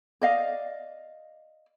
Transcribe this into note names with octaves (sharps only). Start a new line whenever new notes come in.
D5 D#5 F5